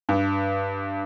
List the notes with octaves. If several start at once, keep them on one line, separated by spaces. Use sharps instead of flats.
G2